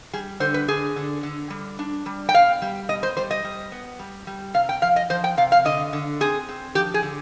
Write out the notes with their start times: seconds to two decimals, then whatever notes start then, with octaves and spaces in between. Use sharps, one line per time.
0.13 G3 G#4
0.40 D3 C5
0.54 B4
0.68 D3 G#4
0.96 D3
1.23 D3
1.50 G3
1.79 D4
2.06 G3
2.29 G5
2.34 B2 F5
2.62 G3
2.89 B2 D#5
3.03 C5
3.17 G3 C5
3.31 D#5
3.44 G3
3.72 B3
3.99 G3
4.27 G3
4.54 C3 F5
4.69 G5
4.82 F3 F5
4.96 D#5
5.10 F3 C5
5.24 G5
5.37 C3 F5
5.52 F5
5.65 D3 D#5
5.93 D3
6.20 C4 G#4
6.49 C4
6.75 F3 G4
6.94 G#4
7.03 D3